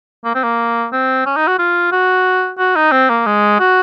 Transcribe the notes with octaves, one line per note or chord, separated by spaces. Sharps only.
A#3
C4
A#3
C4
C#4
D#4
F#4
F4
F#4
F#4
D#4
C4
A#3
G#3
F#4